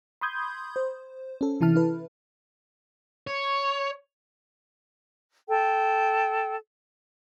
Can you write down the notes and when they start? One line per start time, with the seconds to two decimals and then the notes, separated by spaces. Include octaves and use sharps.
0.21 B5 C6 D#6 G6 G#6
0.76 C5
1.41 C#4 A4
1.61 C3 E3 E4 A5 F6
1.75 E4 B4
3.27 C#5
5.49 A4 G5